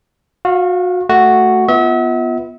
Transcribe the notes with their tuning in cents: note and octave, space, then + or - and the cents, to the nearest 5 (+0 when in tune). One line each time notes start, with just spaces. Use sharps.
F#4 -30 F5 +0
A3 +5 F#4 +0
B3 +0 F4 -10 E5 -40